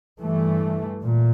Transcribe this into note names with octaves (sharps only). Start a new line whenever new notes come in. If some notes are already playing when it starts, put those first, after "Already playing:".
G2 E3 A3
A#2